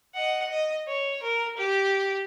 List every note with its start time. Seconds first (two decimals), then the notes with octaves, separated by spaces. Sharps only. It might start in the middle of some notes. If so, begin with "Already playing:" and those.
0.14 D#5 F#5
0.50 D#5
0.88 C#5
1.23 A#4
1.57 G4